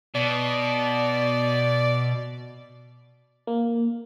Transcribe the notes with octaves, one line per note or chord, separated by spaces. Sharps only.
B2 D5
A#3